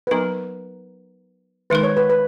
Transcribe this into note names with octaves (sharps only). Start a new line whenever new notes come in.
B4
F#3 B3 D#4 A#4
D#3 G#3 D#4 A#4 B4
C#5
B4
B4